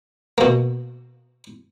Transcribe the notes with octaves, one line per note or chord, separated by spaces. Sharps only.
B2 A#3